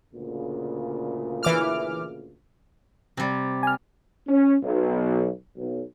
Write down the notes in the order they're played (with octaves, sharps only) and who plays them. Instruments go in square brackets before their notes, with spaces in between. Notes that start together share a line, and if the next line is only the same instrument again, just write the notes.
[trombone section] D2 A#2 C#3
[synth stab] E3 D6 F6
[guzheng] C3 G3
[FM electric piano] G#5 F6
[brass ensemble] C#4
B1
B1